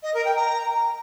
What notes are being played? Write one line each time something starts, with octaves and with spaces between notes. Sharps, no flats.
D#5
A#4
G5
A#5